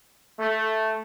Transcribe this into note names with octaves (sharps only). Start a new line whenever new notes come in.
A3